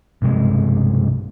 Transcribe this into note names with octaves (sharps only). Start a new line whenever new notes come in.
B1 G2 C3 G#3